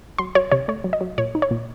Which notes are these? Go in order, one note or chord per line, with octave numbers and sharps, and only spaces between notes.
F#3 C6
F#3 C#5
C3 C#5
A3 C#5
F#3
D#5
F#3
A#2 C#5
D#4
C#5
A#2